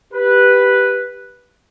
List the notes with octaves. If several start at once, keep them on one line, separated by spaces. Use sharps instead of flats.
G4 B4